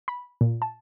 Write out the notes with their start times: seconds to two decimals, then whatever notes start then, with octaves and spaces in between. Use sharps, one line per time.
0.08 B5
0.41 A#2
0.62 A5